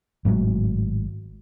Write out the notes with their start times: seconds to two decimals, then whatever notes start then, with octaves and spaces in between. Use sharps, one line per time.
0.25 G#1 A2 F#3 G#3